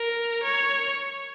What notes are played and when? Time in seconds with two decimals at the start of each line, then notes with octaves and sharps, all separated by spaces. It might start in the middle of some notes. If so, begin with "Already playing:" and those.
Already playing: A#4
0.44 C#5